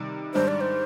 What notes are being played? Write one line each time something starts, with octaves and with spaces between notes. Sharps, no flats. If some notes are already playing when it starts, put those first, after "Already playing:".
Already playing: C3 D#3 G3
G#2 D#3 G3 D4 C5
D5
C5